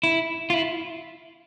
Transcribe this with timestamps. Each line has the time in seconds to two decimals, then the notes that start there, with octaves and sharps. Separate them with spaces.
0.03 E4
0.50 F4
0.54 E4